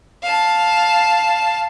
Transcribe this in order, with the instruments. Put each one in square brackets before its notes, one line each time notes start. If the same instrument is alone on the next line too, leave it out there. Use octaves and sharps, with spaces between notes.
[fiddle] F5 A5